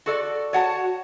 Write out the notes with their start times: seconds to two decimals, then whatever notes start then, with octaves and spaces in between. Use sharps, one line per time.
0.06 F#4 A4 D5
0.53 F#4 C#5 F#5 A5